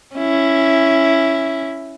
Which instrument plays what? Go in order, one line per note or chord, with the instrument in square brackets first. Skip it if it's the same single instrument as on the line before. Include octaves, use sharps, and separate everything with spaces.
[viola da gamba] C#4 E4